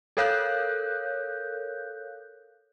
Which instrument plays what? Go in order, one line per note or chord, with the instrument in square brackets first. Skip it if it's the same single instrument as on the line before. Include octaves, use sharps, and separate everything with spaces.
[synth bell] A4 A#4 C#5 F5 F#6 G6